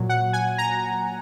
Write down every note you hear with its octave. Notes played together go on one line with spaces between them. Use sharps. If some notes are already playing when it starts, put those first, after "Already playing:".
Already playing: A#2 F#3
F#5
G#5
A#5